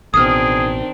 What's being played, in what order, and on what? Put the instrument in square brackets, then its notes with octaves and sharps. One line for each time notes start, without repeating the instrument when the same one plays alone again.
[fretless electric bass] A1 B2 [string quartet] D#3 C4 D4 [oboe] G#4 [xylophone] D#6 F6